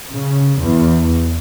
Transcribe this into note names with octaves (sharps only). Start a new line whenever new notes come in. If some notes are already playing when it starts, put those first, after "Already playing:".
C#3
E2